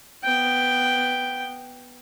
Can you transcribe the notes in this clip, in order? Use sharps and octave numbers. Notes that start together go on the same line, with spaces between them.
B3 G5